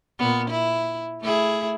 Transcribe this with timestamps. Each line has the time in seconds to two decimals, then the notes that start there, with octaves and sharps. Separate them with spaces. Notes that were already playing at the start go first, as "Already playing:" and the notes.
0.19 A#2 B3
0.50 E4
1.21 A3 E4 G#4